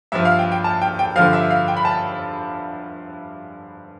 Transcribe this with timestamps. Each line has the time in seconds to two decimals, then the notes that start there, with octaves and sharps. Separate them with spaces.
0.12 G2 F3 E5
0.25 F5
0.39 G5
0.52 G5
0.64 A5
0.81 G5
0.99 G5
1.16 G2 D3 F3 F5
1.33 E5
1.51 F5
1.68 G5
1.77 B5
1.85 A5